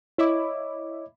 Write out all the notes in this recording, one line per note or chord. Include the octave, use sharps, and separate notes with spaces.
E4 C#5 D#5 D6